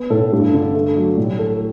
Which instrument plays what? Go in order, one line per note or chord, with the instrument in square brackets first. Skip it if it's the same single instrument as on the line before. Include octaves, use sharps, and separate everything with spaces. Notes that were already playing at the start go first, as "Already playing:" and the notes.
Already playing: [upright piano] B3
[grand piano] A2 [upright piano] A4
[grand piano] G2 [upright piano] A3
[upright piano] D3
A3
F#3
[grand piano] A2 [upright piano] G3
[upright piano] A4